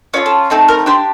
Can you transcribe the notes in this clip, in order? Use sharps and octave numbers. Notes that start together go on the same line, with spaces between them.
C#4 F4 A4 D5
A4
A3 C4 D#4 A4
A#4
D4 G4 C5